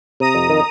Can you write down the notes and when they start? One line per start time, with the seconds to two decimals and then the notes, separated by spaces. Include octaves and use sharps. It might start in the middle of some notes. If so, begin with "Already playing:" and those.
0.20 C3 A#5 D#6
0.35 F2
0.50 D#3